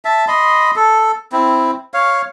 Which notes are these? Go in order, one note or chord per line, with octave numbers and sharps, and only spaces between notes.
E5 A5
D#5 B5 C6
A4
C4 E4
C#5 F5